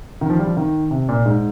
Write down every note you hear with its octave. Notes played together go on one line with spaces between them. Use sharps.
D#3
F3
G3
F3
D#3
C3
A#2
G#2